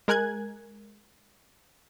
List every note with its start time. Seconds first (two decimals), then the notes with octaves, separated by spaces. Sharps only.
0.08 G#3 A#4 G#5 F#6 G#6